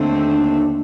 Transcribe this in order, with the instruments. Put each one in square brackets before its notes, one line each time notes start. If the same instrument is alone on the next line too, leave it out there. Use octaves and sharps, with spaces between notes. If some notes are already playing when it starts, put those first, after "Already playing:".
Already playing: [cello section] D#2 D3 A3 C4 [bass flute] D4